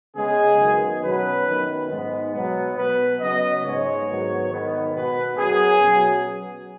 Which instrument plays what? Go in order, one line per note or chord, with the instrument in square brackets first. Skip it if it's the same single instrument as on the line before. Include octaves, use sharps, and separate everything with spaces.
[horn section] C#3 G#3 B3 G#4
F#2 D#3 B3
B2 F#3 C#4 B4
F#2 D#3 B3
G#2 G#3 B3
B2 F#3 B3
B2 B3 B4
C#3 F#3 B3 D#5
G#2 G#3 B3 C#5
G#2 D#3 F#3 B3
G#2 D#3 B3
B2 B3 B4
F#2 F#3 B3 G#4
B2 F#3 C#4